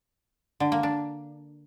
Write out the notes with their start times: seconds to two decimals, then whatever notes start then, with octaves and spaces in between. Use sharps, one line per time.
0.60 D3
0.72 A#3
0.83 D4